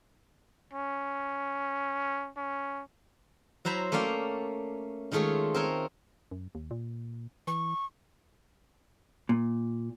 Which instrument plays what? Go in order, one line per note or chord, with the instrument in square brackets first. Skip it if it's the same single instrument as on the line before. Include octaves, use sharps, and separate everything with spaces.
[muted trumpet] C#4
C#4
[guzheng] F#3 E4 C5 A#5 B5
A3 A#3 C#4 D5 F5 G5
D#3 G#3 A3 F4 G#4 C#5
C4 A#4 C#5
[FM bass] F#2
D#2
A#2
[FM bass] E3 [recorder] C#6
[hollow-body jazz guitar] A#2